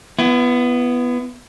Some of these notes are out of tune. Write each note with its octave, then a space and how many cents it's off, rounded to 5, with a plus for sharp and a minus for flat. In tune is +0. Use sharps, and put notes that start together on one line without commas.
B3 +0 E4 +35